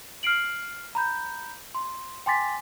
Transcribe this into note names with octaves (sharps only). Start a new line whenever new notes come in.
F6 C7 D7 F#7
A#5 B5 G6
C6
G5 G#5 C6 D6 A6 B6